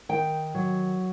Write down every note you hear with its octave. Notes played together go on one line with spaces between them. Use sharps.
D#3 G5
F#3